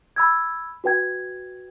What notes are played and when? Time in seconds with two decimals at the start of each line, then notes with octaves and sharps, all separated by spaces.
0.16 B5 E6 G#6
0.84 F#4 B4 G5 G#6